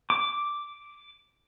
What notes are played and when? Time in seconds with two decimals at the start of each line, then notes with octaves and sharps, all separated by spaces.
0.10 D6